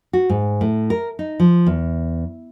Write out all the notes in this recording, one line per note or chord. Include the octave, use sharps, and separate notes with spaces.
F#4
G#2
A2
A#4
D#4
F3
E2